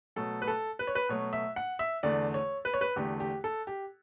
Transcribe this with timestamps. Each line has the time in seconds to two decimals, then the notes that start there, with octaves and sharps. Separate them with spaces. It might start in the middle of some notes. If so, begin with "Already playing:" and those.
0.16 B2 F#3 A3 A4
0.42 B4
0.47 A4
0.79 B4
0.87 C#5
0.95 B4
1.09 B2 F#3 A3 C#5
1.33 E5
1.56 F#5
1.79 E5
2.03 E2 D3 A3 D5
2.34 C#5
2.65 B4
2.74 C#5
2.81 B4
2.96 E2 D3 A3 G4
3.20 G4
3.44 A4
3.67 G4